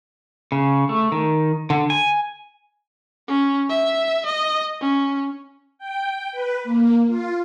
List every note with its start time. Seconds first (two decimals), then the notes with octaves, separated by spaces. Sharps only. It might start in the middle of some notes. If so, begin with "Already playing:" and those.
0.52 C#3
0.89 A3
1.12 D#3
1.70 D3
1.90 G#5
3.28 C#4
3.70 E5
4.26 D#5
4.81 C#4
5.78 G5
6.32 B4
6.64 A#3
7.07 F4